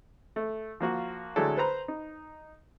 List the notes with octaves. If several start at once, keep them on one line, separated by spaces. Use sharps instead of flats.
A3
F3 A#3 F#4
D3 F#3 G#3 A3 E4 A4
B4 C5 A#5 B5
D#4